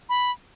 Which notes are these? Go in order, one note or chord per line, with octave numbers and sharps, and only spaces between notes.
B5